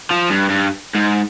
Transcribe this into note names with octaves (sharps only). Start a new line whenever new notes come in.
F3
G2
G2
G#2